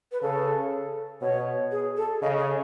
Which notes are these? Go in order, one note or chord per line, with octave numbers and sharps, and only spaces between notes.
B4
C#3 A4
B2 C#5
G#4
A4
C#3 D#5
C#5